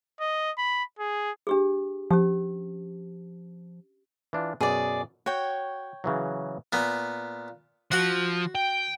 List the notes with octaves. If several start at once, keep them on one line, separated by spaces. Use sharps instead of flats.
D#5
B5
G#4
D4 G4 G#4
F3 C#4 G4
E3 D4 F4
F#2 B2 G#4 D5
F#4 C#5 G5
C#3 E3 F#3
A#2 B3
F3 F#4 F#5
G5